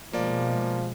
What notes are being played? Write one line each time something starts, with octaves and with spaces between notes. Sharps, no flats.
B2 F3 G#3 A#3 D5